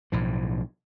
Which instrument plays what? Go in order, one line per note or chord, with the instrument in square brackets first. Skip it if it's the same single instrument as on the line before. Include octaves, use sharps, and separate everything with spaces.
[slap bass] B1 A2 F3